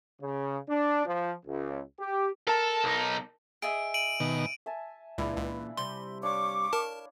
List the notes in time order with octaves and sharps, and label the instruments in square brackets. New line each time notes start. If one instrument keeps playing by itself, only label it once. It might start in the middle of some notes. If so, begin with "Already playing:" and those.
[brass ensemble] C#3
D4
F3
C#2
G4
[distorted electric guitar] A4 [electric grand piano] A#4 A5
[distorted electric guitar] B1 D#4
[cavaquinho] G#4 D#5 E5 [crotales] D7
[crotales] D7 D#7 F#7
[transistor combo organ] B2 D#3 [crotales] F#7
[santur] E5 G#5 A5
[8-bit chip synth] C#2 [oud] A#2 C#3 E3 [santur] D4 E4
[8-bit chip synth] C#2 [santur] B5
[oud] C3 G3 [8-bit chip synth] C6
[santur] D4 C#5 F5 [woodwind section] C#6 D6
[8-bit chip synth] A#4 A5